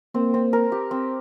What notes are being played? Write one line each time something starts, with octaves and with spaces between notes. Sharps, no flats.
A#3 C4
C4
A#4
G4
C4